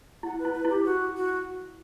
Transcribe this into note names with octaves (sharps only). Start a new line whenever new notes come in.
E4 F#5
B4
E4
B4
E4
G4
F#4
F#4